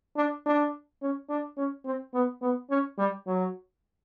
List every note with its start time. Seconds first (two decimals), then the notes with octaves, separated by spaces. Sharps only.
0.17 D4
0.46 D4
1.02 C#4
1.30 D4
1.57 C#4
1.85 C4
2.14 B3
2.42 B3
2.70 C#4
2.98 G3
3.27 F#3